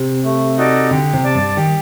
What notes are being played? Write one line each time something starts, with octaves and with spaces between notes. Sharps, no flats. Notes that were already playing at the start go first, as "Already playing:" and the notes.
Already playing: C3
A3
D#4 F#4 A4 D5
D3 G4
C3
D5 A5
G2
D#3 G4